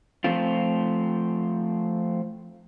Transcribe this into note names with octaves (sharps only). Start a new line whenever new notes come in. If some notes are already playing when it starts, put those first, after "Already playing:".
F3 A3 C4 F4